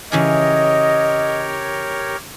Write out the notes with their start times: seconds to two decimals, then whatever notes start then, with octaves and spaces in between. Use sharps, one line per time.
0.12 C#3 E3 G4 G#4 A#4 C#5 D#5